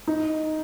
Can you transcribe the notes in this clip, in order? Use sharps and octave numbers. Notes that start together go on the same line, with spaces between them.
D#4